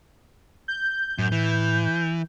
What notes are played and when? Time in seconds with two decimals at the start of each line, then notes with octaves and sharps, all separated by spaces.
0.68 G6
1.19 F#2 A2
1.32 E3